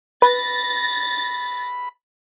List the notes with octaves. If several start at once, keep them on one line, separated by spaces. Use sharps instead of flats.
B4 B5 A6 A#6